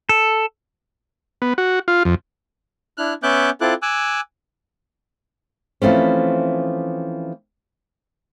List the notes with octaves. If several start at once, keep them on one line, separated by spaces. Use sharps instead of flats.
A4
B3
F#4
F4
F2
D4 E4 F6 F#6
B3 C#4 E5 D6 F#6 G6
C4 E4 F4 A4 D6 F#6
G#5 D6 E6 F#6
E3 F3 A3 C4 C#4